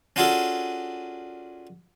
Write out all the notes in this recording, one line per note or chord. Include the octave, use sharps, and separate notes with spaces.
C#4 D4 F4 F#4 G#4 A4